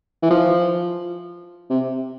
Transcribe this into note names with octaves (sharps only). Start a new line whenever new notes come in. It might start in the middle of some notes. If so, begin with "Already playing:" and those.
E3
F3
C3